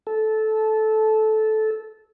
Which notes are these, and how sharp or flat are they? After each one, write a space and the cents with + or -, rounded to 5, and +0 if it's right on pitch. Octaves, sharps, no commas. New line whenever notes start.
A4 -15